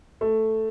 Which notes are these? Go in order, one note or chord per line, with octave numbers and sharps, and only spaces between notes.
A3